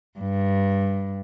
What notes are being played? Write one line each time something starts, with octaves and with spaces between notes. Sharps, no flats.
G2